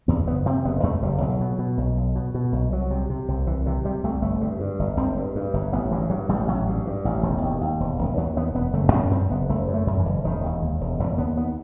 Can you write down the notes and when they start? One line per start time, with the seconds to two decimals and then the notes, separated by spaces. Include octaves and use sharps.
0.08 E2 B3
0.27 F#1 B3
0.46 C3 C4
0.65 F#1 B3
0.83 E2 A3
1.02 F#1 G3
1.21 B1 F#3
1.41 B2
1.59 B2
1.77 B1
1.97 B1
2.15 B2
2.34 B2
2.52 B1
2.72 C2 F#3
2.91 C3
3.10 C3
3.28 C2
3.47 C2 E3
3.66 C3 E3
3.85 C3 G3
4.04 C2 A3
4.22 G1 A3
4.41 G2
4.60 G2
4.79 G1
4.97 G1 C4
5.17 G2
5.35 G2
5.53 G1
5.73 A1 B3
5.91 G2 E3
6.10 G2 F#3
6.29 A1 G3
6.48 A1 F#3
6.67 G2
6.86 G2
7.05 A1
7.23 E1 D#3
7.42 D#2
7.61 D#2
7.80 E1
7.99 E1
8.17 D#2 F#3
8.36 D#2 B3
8.54 E1 B3
8.73 F#1 A3
8.92 F#2 B3
9.11 F#2 C4
9.30 F#1 B3
9.49 F#1 A3
9.68 F#2
9.74 A3
9.87 F#2
10.00 E3
10.05 F#1
10.24 E1 D#3
10.43 D#2
10.62 D#2
10.81 E1
10.99 E1 E3
11.18 D#2 B3
11.37 D#2 B3